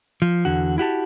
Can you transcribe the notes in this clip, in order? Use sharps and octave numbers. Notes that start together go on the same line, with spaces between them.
F3
E2 D3 F#4
E4 F#4 G4 A5